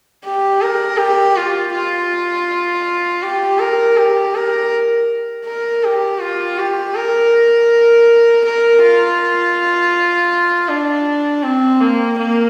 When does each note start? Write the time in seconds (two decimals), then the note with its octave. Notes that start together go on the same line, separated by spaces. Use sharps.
0.25 G4
0.62 A#4
0.98 G4
1.36 F4
1.73 F4
3.23 G4
3.59 A#4
3.97 G4
4.35 A#4
5.46 A#4
5.84 G4
6.21 F4
6.58 G4
6.95 A#4
8.45 A#4
8.82 F4
10.69 D4
11.43 C4
11.81 A#3
12.18 A#3